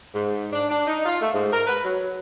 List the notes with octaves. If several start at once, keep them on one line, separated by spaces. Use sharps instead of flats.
G#2
D4
D4
D#4
F4
A3
G#2
A#4
B4
F#3